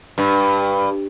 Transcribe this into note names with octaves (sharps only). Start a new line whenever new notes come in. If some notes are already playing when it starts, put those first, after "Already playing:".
G2